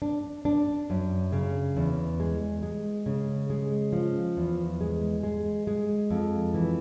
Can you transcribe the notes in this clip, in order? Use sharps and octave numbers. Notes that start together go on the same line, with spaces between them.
D4
D4
F#2
C#3
E2
G#3
G#3
C#3
G#3
F3
E2
G#3
G#3
G#3
F2
E3